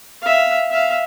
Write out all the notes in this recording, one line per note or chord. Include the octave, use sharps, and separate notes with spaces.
E5 F5
E5 F5